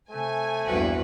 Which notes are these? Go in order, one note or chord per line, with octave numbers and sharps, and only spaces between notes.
C3 A3 G#5
A#1 E2 G2 F#4 B4